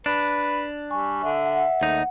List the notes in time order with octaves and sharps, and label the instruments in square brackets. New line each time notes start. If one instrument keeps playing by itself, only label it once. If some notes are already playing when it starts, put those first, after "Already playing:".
[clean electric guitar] D4 [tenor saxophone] B4
[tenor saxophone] G3 [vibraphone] G#5 C#6
[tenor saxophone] D3 [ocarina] E5
[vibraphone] F#5
[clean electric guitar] D#2 D#4 [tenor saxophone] A3